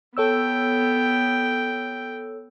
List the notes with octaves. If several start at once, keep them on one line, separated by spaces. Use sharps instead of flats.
B3 A4 C#5 G5 E6